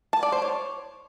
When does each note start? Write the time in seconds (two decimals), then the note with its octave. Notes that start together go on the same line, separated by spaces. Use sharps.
0.13 A5
0.23 D5
0.32 C5
0.42 C#5